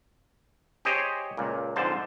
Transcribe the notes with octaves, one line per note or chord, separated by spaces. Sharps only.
G4 G#4 C5 C#5 D#5
C#2 A#2
F2 G#2 D3 C5 A5